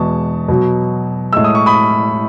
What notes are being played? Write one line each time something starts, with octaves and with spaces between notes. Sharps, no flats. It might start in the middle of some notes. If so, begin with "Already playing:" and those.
Already playing: E2 B2 G#3 A5 C#6
B2 F#3
A2 G#3 E6
D#6
C#6
B5 D#6